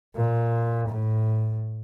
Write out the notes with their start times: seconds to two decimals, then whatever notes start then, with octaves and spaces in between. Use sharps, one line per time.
0.15 A#2
0.89 A2